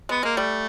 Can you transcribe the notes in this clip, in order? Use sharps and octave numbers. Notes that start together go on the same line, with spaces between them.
G#3 B3
G#3 A#3
G3 A3